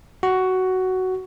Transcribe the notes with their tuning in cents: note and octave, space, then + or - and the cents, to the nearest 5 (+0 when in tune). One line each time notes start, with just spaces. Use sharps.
F#4 +10